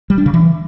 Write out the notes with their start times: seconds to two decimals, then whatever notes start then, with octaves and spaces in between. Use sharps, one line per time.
0.10 G3
0.18 D4
0.26 C#3
0.34 E3